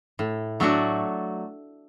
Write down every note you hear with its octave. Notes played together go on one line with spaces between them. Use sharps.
A2
F#3 A3 D4 F#4